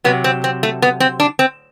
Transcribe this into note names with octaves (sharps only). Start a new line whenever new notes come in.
C3 F#3 B3
C4
C4
A3
B3
C4
D4
C4